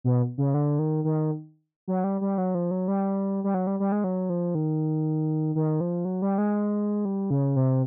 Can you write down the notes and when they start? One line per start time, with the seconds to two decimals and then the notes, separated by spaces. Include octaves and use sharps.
0.04 B2
0.38 C#3
0.54 D3
0.79 D#3
1.04 D#3
1.88 F#3
2.04 G3
2.21 G3
2.38 F#3
2.55 F3
2.71 F#3
2.88 G3
3.44 G3
3.54 F#3
3.67 G3
3.80 G3
3.92 G#3
4.04 F#3
4.30 F3
4.55 D#3
5.55 D#3
5.81 F3
6.05 F#3
6.22 G3
6.38 G#3
7.05 G3
7.30 C#3
7.56 C3